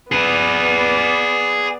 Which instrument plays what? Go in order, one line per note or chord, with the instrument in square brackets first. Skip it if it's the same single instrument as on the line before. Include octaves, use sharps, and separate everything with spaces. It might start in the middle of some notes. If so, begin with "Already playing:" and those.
[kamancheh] B3 D5 [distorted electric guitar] G#4 B4